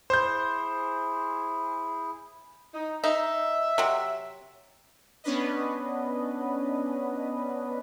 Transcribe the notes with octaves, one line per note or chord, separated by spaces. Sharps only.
E4 G#4 C5 G6
D#4
D#4 E5
C3 F#3
B3 C#4 D4 B4 D#5